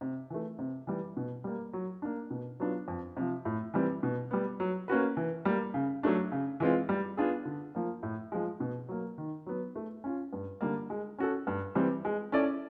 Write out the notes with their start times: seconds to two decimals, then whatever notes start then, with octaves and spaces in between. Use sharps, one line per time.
0.01 C3
0.30 E3 A3
0.59 C3
0.87 E3 G3
1.17 B2
1.44 G3 A#3
1.73 F#3
2.02 A#3 D4
2.30 B2
2.60 F#3 B3 D4 F4
2.88 F2
3.17 C3 F3
3.45 A2
3.74 E3 G3 C4
4.03 B2
4.31 G3 B3
4.60 F#3
4.88 A#3 C#4 F#4 B4
5.17 E3
5.45 G3 A#3
5.74 C#3
6.03 F#3 A3 D4
6.32 C#3
6.60 E3 G#3 C4 F4
6.89 G3
7.17 B3 D4 F4 G#4
7.45 D3
7.75 F3 A#3
8.03 A2
8.32 F3 G#3
8.60 B2
8.89 F#3 A#3
9.18 D#3
9.46 F#3 B3
9.76 A3
10.04 C#4 F4
10.33 G2
10.61 D3 G3 A#3
10.90 G#3
11.19 C#4 F#4 A4
11.47 G2
11.75 E3 G3 C4
12.05 G#3
12.32 C#4 E4 A4 D5